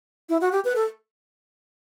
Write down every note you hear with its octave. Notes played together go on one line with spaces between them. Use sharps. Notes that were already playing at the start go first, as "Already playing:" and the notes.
E4
F#4
G4
B4
A4